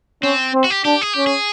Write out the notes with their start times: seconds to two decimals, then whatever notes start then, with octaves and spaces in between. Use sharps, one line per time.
0.23 C4 C#4
0.54 C4
0.64 F#4
0.70 G4
0.85 D4 G4
1.01 G#4
1.14 C#4 G4
1.27 G#4